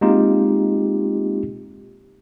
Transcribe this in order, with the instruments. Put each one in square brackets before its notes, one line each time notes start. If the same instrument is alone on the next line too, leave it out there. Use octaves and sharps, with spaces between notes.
[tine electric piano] G#3 A#3 C4 D#4 F4 G4